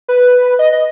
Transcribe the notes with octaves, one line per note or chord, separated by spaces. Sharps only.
B4
D#5
D#5